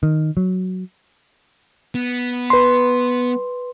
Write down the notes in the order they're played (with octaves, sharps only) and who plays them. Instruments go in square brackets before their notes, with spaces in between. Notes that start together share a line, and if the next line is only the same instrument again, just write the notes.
[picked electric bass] D#3
F#3
[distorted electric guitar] B3
[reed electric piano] B4 C6